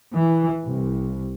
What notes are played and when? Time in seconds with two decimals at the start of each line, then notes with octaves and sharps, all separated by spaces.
0.15 E3
0.63 C2